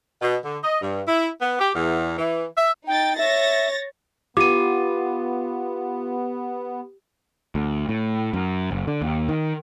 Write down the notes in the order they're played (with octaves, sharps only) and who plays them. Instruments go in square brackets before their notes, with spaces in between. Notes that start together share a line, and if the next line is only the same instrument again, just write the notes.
[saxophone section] B2
D3
D#5
G2
E4
B3
G4
E2
E3
E5
[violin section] D#4 A6 [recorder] G5
[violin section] C#5 A6 A#6 [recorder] E5
[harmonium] B3 [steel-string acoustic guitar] F4 [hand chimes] G4 [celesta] D6 D#7
[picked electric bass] D2
A2
F#2
F#1
D3
D#2
D#3